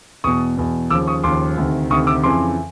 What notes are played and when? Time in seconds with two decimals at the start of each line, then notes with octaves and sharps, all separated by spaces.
0.24 E2 B2 C#6 D#6
0.57 E2 B2
0.90 D#2 C#3 F3 D6 E6
1.07 C#6 D#6
1.24 D#2 C#3 F3 C6 D6
1.57 D2 C3 D#3
1.90 D2 C3 D#3 C#6 D#6
2.07 D6 E6
2.23 F2 C#3 E3 C6 D6